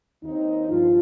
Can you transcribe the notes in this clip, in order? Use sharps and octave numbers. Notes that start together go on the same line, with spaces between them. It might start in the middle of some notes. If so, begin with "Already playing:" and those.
D#2 D#3 C4 D#4
G2 F3 F4